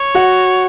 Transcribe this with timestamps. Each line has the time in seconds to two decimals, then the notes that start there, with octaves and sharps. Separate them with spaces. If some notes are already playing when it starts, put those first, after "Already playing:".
Already playing: C#5
0.15 F#4 F#5